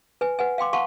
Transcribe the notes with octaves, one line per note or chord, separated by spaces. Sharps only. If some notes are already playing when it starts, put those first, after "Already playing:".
B4 G#5
B4 F#5 G#5
F5 G5 C6 D6
F5 F#5 A5 C6 C#6